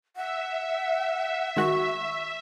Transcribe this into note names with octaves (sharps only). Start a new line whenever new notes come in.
E5 F#5
D#3 G#3 F#4 C#6